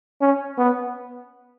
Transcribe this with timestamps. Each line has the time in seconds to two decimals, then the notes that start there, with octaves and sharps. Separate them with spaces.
0.22 C#4
0.58 B3